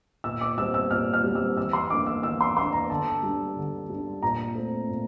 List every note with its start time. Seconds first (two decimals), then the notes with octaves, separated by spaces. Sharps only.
0.24 A#2 E6
0.41 D6
0.58 G3 C4 E6
0.74 E6
0.91 A#2 F6
1.14 F6
1.24 G3 C4
1.35 E6
1.57 E3 E6
1.73 C6
1.90 A#3 D4 D6
2.06 E6
2.23 E3 E6
2.41 C6
2.56 A#3 D4 C6
2.73 A#5
2.89 D3 A5
3.23 G3 D4
3.57 D3
3.89 G3 D4
4.22 A#2 A#5
4.55 A3 C4
4.88 A#2